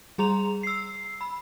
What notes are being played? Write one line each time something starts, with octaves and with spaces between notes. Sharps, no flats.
G3 G#4 A#5 C6 F7
E6 C7
B5